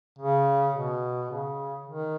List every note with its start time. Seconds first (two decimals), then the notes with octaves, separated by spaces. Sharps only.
0.18 C#3
0.75 B2
1.30 C#3
1.86 D#3